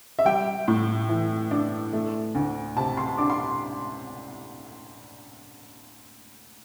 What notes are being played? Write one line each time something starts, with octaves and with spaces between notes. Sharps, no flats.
E5
G3 G5
A2
E3
D4
A3
D2
C3 A5
C6
D4 D6
C6